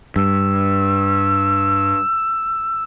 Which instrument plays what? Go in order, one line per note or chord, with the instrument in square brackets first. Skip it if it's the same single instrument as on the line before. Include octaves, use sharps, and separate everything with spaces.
[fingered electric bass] G2 [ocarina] E6